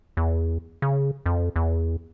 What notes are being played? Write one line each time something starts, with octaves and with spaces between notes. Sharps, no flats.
E2
C#3
F2
E2